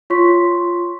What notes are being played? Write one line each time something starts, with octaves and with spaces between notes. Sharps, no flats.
F4 C#5 C6 C#6 B6